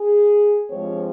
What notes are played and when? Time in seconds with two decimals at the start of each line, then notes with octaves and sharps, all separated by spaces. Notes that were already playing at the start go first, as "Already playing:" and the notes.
Already playing: G#4
0.70 G2 F3 G#3 C4 C#5